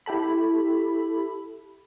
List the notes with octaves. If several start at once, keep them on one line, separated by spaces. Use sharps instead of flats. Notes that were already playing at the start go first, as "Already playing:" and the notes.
E4 G4 A4 B5